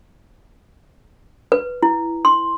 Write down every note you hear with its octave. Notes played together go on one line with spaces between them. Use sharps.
B4
E4
C6